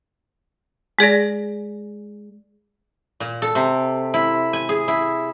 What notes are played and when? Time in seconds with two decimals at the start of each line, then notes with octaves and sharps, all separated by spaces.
0.99 G#3 G#4 D5 A#6
3.20 A#2
3.42 A4
3.55 C3
4.14 E4
4.53 G#5
4.69 G#4
4.88 E4